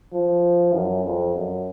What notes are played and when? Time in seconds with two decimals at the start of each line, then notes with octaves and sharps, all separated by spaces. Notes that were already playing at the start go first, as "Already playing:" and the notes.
0.12 F3
0.74 F#2
1.05 F2
1.35 F#2